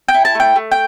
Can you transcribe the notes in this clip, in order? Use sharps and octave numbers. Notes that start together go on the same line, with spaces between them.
G5
E4
A5
A3 G5
A3
G5